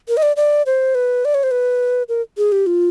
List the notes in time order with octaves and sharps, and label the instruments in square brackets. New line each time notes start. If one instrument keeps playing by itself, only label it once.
[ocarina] A#4
D#5
D5
D5
C5
B4
D5
C#5
C5
B4
A#4
G#4
G4
F4